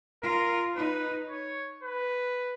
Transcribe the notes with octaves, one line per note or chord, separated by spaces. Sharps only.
F4 A#4
D#4 B4
C#5
B4